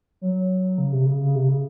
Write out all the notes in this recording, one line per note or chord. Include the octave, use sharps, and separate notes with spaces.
F#3
C#3
C3
C#3
C#3
C3
C#3